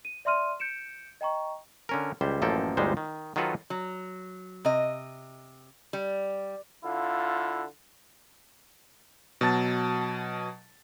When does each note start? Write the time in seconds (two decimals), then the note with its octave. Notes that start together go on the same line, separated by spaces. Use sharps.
0.05 D#7
0.25 D5 E5 C6 F6 D#7
0.60 G6 C#7 D7 E7
1.21 D#5 G5 A#5 C#6
1.89 D3 C#4 A#4
2.21 C#2 G3 C5
2.42 A1 F#2 F3 A#3 A4 G5
2.77 G1 D2 G3 G#3 D#4 C5
2.97 D#3
3.36 D#3 F#3 F4 F#4 A4 B4
3.70 F#3
4.65 C3 D#5
5.93 G3
6.83 D3 E4 F4
9.41 B2 F#3 A5 A6